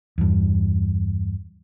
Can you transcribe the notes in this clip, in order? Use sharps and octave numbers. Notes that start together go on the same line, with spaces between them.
E2 G2